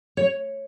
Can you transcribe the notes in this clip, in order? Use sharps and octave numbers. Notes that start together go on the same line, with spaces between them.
C#5